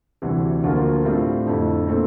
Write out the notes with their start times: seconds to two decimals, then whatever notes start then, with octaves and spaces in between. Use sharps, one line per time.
0.22 D2 C3 E3 G3 D4
0.63 D2 D3 F3 A#3 F4
1.05 A2 G3 C4 F4
1.46 F2 D3 A3 E4
1.87 A#2 A3 C4